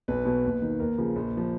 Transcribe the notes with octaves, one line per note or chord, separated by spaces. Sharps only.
B1 B4
B2
D#2
D#3
D#2 A#4
C#3 F3
A#1
F3